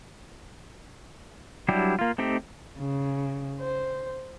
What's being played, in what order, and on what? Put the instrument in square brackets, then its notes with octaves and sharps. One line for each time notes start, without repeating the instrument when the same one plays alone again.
[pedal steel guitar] F#3 G3 D4 E4 G4
A#3 F4
A3 C4 D#4 G4
[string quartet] C#3
C5